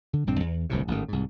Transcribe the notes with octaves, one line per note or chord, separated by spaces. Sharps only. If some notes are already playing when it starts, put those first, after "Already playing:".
D3
A#1 G2 C4
E2
D1 C2 A2 C3
A1 G#2 D#3
C2 G#2